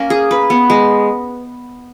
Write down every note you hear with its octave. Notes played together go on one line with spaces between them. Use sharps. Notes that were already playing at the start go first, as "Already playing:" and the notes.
Already playing: A#3 C#4
G#4
B4
B3
G#3